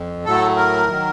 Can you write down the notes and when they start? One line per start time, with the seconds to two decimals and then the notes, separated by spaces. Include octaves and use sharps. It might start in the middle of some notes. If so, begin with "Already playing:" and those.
Already playing: F2
0.25 A2 F#3 A3 A4
0.56 A#4
0.88 D#3 F#3